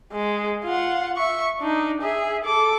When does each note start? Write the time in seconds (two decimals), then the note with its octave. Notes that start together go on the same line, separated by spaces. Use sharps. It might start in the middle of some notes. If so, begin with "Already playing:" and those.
0.12 G#3
0.64 F4 F#5
1.16 E5 C#6
1.59 D4 D#4
2.02 G#4 E5
2.45 A4 D6